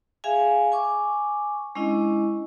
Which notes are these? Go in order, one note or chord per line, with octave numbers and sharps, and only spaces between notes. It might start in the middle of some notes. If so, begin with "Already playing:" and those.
G#4 E5 F5 G#5
G#5 C#6 D6
G#3 C#4 D4 E4 D#5